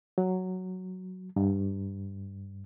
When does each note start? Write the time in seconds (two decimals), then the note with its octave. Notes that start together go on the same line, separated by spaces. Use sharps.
0.18 F#3
1.36 G2